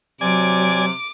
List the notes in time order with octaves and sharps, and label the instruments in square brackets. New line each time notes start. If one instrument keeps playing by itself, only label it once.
[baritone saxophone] C3 [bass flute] F#3 [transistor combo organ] D5 G#5 [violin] D6